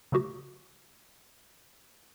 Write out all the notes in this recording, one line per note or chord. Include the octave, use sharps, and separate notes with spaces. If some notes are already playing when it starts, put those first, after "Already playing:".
C#3 F#3 A3 F#4 G4